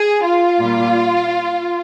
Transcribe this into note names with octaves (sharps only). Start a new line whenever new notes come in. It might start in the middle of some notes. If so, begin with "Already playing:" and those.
Already playing: G#4
F4
A#2 G3 A#3